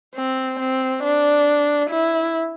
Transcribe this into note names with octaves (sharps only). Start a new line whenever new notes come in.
C4
C4
D4
E4